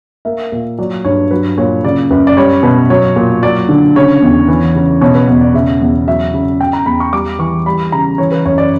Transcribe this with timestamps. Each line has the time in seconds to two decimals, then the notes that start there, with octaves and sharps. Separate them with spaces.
0.25 A#3 E5
0.52 A#2
0.79 F#3 D5
1.05 G2 C#5
1.31 F#3 B4
1.58 A#2 C#5
1.84 C#3 D5
2.11 F#2 B4
2.27 D5
2.37 G3 C#5
2.63 B2 B4
2.90 F#3 C#5
3.16 A#2
3.43 F#3 D5
3.69 D3
3.95 C#3 C#5
4.22 E2
4.48 E3
4.75 C#3
5.01 B2 C#5
5.15 B4
5.28 E2
5.41 D5
5.54 C#3 E5
5.81 E2
6.07 F#3 E5
6.34 C#3
6.61 C#3 G5
6.73 A#5
6.86 E2 B5
7.00 C#6
7.13 G3 D6
7.39 E3 C#6
7.66 G3 B5
7.92 C#3 A#5
8.18 E3 C#5
8.32 B4
8.46 F#2 C#5
8.58 D5